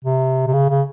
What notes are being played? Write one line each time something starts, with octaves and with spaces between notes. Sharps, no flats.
C3
C3
C#3
C#3